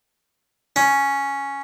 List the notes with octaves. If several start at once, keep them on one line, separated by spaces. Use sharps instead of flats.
C#4